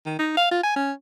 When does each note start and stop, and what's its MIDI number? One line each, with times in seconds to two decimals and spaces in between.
0.06 0.18 51
0.19 0.35 63
0.38 0.49 77
0.51 0.63 65
0.64 0.75 80
0.76 0.92 61